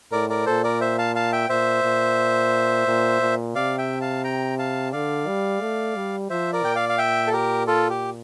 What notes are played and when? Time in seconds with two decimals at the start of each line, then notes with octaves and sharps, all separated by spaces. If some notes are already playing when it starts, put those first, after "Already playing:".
0.12 A2 A#4 D5
0.30 A#4 D5
0.46 A#2 A4 C5
0.64 A#4 D5
0.81 C5 E5
0.98 F5 A5
1.15 F5 A5
1.32 E5 G5
1.49 A#2 C5 E5
1.83 A#2
2.87 A#2
3.21 A#2
3.55 C3 D5 F5
3.78 E5 G5
4.01 F5 A5
4.24 G5 A#5
4.59 F5 A5
4.92 D3 D5 F5
5.27 G3
5.61 A3
5.95 G3
6.30 F3 C5 E5
6.53 A#4 D5
6.64 A#2 G5
6.75 D5 F5
6.89 F5
6.98 E5 G5
7.27 A4
7.33 G4 A#4
7.67 F4 A4
7.89 G4